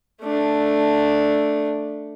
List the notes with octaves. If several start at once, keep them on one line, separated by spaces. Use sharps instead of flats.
A3 D4